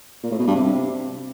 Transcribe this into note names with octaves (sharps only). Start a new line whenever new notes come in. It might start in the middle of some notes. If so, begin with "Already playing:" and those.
A#2
A2
B2
G2
C3